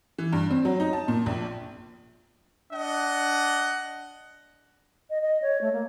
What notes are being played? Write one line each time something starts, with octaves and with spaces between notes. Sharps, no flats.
E3
G2
C4
F#3
D#4
A5
A#2
A#1
D4 D#5 F#5
D#5
D#5
C#5
A3
A#3